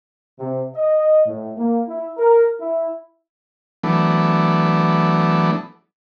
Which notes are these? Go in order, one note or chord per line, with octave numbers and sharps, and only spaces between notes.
C3
D#5
A2
A#3
E4
A#4
E4
E3 F#3 A3 B3 D4